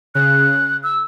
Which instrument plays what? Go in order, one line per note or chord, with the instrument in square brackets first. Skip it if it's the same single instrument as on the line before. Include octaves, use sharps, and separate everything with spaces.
[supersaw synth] C#3 [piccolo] F#6
[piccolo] E6